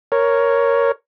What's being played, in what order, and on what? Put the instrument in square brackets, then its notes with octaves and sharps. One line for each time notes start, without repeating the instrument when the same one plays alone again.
[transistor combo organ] A#4 C#5